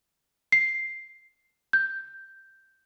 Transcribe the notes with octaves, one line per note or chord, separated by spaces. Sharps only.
C7
G6